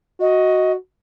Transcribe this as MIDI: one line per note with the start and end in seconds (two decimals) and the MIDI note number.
0.20 0.75 66
0.20 0.72 75